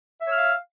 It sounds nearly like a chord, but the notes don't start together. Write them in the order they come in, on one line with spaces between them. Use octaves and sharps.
E5 C#5 E6 F6 F5